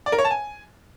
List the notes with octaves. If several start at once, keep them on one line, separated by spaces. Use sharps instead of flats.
D5
A#4
C#5
A5
G#5